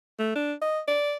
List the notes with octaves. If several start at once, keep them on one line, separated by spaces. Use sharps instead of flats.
A3
D4
D#5
D5